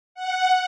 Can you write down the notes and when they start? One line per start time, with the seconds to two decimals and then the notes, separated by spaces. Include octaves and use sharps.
0.15 F#5